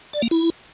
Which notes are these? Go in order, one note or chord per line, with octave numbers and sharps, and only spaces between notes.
D5
A#3
E4